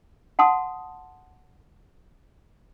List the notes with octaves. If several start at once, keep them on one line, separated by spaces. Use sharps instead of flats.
F#5 A5 C6 D#6